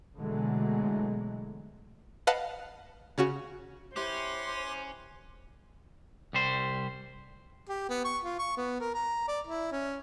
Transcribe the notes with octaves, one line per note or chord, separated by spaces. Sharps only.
B2 D3 E3 F#3 G#3 A3
B4 D#5 F5 F#5 A5
C#3 C#4 F#4
C#4 E4 G4 B4 C5 C6 D6
C2 G3 C5
G4
B3
C#6
F4
C#6
B3
A#4
A#5
D5
E4
C#4